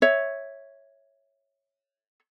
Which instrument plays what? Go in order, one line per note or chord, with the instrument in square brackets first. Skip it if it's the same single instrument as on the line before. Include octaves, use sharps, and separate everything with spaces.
[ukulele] C#5 E5